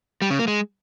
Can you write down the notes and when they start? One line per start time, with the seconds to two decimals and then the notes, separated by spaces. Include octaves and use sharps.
0.22 G3
0.30 C#3
0.39 A#3
0.48 G#3